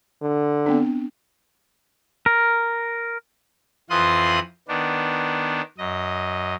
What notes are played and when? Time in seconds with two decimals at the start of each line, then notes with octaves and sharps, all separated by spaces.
0.22 D3
0.66 B3 C4 D4
2.26 A#4
3.90 F2 E3 F4 C6 D#6 F#6
4.68 D#3 B3 D4
5.78 F#2 D#5